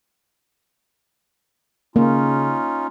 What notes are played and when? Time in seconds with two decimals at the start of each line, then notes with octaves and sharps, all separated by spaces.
1.96 C#3 A#3 C#4 D#4 F4